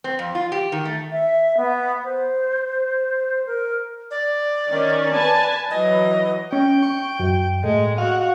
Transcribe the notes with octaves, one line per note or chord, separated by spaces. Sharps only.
C4
F2
F4
G4
D#3
A3
E5
B3
C5
A#4
D5
D#3 C#4
B4 G#5 A5
E3 F#3 D#5
C#4 G5
C#6
F#2
A2 G#3
F#4 F5